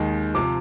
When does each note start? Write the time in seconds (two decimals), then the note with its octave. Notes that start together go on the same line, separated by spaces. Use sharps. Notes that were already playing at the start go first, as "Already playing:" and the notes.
Already playing: D#2 D#3 G#3
0.34 C3 F3 D6